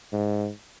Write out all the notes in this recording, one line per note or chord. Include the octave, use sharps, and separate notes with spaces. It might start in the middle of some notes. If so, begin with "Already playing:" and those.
G#2